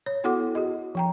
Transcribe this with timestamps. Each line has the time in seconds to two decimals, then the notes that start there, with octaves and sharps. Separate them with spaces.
0.06 C#5
0.24 B3 E4 F#4 A4 F#5 D6
0.55 F#4 G#4 D#5
0.95 F3 G5 A#5